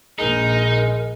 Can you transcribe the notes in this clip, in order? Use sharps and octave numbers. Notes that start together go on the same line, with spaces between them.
A#1 G#3 D#4 A#4